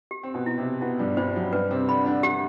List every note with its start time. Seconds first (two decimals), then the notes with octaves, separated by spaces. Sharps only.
0.11 G4
0.23 C4
0.34 B2 B3
0.46 E4
0.58 C3 C4
0.81 B2 B3 E4
0.99 G2 G3
1.17 G2 G3 C5
1.35 F#2 F#3
1.53 G2 G3 B4
1.70 C3 C4
1.88 D3 D4 B5
2.06 D3 D4
2.23 D3 D4 G4